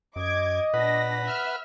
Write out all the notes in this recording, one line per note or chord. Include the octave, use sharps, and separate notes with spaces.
F#2 D#5 D6 G#6
A#2 D4 B4 F#5 A#6
E5 F6